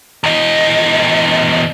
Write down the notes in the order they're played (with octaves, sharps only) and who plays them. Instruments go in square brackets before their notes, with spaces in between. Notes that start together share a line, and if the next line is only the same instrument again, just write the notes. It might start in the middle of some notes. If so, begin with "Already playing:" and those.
[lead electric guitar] E2 D#5